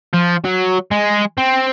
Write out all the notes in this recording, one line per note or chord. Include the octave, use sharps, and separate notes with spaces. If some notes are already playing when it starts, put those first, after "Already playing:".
F3
F#3
G#3
C4